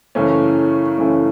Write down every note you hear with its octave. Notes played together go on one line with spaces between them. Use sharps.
F#2 C#3 E3 A3 C#4
F#2 C#3 E3 A3 C#4